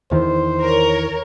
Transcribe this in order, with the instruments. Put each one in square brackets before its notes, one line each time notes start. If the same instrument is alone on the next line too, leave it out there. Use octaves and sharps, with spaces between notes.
[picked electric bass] E2 D#3 E3 [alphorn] C5
[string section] A#4 C#5